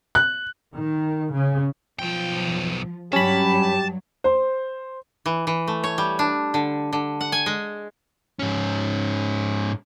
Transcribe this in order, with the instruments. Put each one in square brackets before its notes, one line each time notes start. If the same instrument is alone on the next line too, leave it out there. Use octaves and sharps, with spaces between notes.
[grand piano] F#6
[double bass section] D#3
C#3
[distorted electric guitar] B1 G5 [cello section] F3
[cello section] G2 F#3 [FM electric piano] C#4 B5 [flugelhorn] G4 [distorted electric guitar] A5
[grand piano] C5
[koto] E3
E3
A3
C#5
G3
D4
D3
D3
F#5
G#5
G#3
[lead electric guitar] G#2 C#4